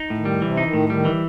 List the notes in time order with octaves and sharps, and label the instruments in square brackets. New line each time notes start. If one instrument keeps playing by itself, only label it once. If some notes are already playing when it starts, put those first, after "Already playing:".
Already playing: [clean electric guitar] D#4
A2
[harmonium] D#3
[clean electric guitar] G3
[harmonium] C3 [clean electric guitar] E3
[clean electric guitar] D#4
[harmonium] D#3
[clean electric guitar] A2
[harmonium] D#3 [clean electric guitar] G3
[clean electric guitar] E3